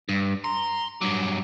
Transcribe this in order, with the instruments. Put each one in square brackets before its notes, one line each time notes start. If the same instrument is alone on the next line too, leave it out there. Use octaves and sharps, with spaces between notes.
[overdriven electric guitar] G2
[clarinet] A#5 [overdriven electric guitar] C6
[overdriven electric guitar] G2 F#3 [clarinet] D6